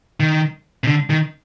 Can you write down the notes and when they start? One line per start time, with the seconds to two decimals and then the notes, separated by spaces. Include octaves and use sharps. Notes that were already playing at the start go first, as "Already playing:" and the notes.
0.20 D#3
0.84 C3
0.87 D3
1.10 D#3